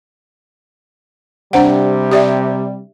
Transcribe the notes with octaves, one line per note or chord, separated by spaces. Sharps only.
C3 G3 D4 C5 F#5
G4 D5 E5